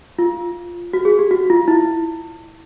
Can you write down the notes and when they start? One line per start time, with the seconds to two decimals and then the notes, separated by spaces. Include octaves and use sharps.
0.19 F4
0.93 F#4
1.05 G#4
1.19 G4
1.31 F#4
1.50 F4
1.68 E4